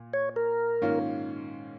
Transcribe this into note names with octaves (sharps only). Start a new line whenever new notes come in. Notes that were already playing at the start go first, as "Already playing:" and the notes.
Already playing: A#2
C#5
A#4
G#2 D#3 A#3 C#4 F4